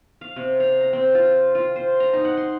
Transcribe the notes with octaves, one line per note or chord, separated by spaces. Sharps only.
F5
C3
F5
A#5
C4
F4
F4
C5
A#5
D#4
F#5
C6